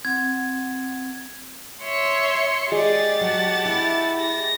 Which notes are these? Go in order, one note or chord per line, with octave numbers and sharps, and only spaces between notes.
C4 F#5 G#6
C#5 E5 C6 C#7
G#3 G4 G#4 D5 A6
F#3 F#5 A5
E4
A#6